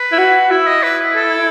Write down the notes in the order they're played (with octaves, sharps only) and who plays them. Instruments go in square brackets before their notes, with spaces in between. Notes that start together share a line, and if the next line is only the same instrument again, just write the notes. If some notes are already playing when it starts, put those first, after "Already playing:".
Already playing: [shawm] B4
[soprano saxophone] E4
F#4
[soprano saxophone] E4 [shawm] E5
[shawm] D#5
B4
A4